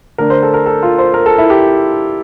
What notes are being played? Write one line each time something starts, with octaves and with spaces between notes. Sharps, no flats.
D3 A3 D4 A#4
C5
A4
A#4
A4
F4
C5
A#4
A4
E4
G4